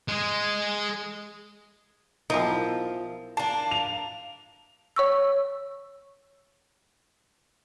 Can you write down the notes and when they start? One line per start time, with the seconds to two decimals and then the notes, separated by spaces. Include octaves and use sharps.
0.08 G#3 G#4
2.30 B1 F3 D#4 E4 A#4
3.37 A#3 D4 A5
3.71 F7
4.96 C#5 C#6 E6